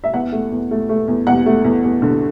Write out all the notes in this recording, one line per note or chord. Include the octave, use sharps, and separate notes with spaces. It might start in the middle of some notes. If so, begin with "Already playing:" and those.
E5
E2 F#5
A3
E2
A3
A3
E2
E2 F#5
A3
E2
E2
D3